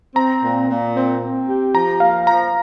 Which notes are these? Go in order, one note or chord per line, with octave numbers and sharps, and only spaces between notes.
C4 A#5
A#2
A#2
C4
C4
G4
F3 A#5
A#3 F5
F3 A#5